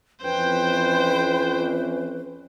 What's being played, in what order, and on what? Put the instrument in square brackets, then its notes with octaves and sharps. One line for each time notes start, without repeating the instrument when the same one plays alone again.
[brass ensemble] F2 E3 C#4 [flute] B4 [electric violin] C5 G5